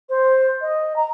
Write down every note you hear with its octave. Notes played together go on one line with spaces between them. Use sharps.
C5
D#5
A#5